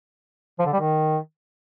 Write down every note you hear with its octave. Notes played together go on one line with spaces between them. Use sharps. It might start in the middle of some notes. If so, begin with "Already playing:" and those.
F3
D3
G3
D#3